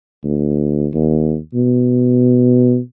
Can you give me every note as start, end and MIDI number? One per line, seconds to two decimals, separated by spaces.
0.23 0.88 38
0.94 1.38 39
1.54 2.78 47